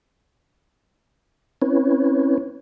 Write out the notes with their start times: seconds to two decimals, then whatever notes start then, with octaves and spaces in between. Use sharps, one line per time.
1.62 C4 C#4 E4 B4 C#5